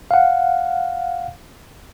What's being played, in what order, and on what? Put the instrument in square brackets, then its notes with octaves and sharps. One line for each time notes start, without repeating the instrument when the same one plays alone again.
[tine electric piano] F5 F#5